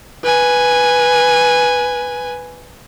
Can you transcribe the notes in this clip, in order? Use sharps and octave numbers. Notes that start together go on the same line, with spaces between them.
B4 G#5